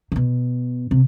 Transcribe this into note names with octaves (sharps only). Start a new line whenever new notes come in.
C3
B2
C3